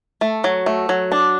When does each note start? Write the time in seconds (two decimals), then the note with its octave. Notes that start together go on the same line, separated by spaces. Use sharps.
0.21 A3
0.44 F#3
0.66 A3
0.89 F#3
1.12 D4